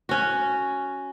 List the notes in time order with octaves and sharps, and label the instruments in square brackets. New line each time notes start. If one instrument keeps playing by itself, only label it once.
[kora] C#4 F#4